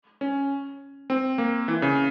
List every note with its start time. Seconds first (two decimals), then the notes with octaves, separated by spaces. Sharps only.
0.21 C#4
1.10 C4
1.38 A#3
1.68 E3
1.82 C#3